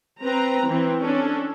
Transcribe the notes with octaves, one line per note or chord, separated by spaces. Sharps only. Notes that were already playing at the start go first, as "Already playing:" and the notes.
C4 B4 A#5
E3 C4
C#4 D4 A4